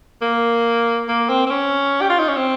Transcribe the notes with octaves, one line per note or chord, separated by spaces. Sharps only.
A#3
A#3
C4
C4
C#4
G4
F4
D#4
C#4
C4